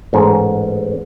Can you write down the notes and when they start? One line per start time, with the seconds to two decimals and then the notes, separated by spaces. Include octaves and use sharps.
0.13 A1 G#2